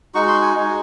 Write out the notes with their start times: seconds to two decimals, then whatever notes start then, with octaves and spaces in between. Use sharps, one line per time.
0.14 G#3 D#4 F#4 C#6
0.28 C6
0.42 G#5
0.55 G#3 D#4 F#4